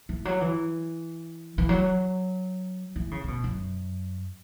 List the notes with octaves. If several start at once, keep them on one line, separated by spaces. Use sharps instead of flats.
E3
F#3
E3
E3
F#3
E3
C#3
C#3
B2
F#2